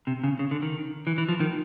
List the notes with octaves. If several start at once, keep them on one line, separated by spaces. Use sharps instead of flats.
C3
C#3
C#3
D3
D#3
E3
E3
F3
D#3